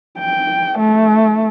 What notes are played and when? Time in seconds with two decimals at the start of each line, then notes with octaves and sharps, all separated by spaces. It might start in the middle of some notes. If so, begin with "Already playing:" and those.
0.19 G5
0.79 A3